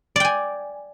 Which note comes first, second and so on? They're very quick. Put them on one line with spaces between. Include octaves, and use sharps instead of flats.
D5 G5 G#5